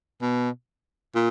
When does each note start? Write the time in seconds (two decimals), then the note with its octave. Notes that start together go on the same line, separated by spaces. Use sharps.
0.21 B2
1.15 A#2